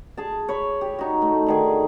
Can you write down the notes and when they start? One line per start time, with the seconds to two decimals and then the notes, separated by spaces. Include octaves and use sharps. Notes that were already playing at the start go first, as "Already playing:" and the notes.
0.17 G#4 A5
0.49 C#5 B5
0.81 G4
0.99 D#4 F#4
1.22 A3
1.46 D3 D#3 G#4